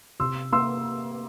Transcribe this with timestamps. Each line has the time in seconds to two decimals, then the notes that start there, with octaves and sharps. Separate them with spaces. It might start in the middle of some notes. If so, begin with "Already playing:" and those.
0.20 C3 C6 E6
0.53 A#3 C6 E6